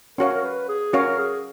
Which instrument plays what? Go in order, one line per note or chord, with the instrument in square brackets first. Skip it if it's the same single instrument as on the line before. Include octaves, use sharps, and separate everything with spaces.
[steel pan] C#4 F#4 C#5 F5 [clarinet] A#4
[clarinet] A#4
B4
G#4
[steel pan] C#4 F#4 C#5 F5 [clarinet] A#4
[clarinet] G#4